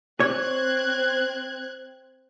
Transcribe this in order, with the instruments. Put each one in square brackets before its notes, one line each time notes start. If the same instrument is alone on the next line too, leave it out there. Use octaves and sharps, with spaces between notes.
[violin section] C4 F#6 G#6 [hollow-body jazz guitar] C#5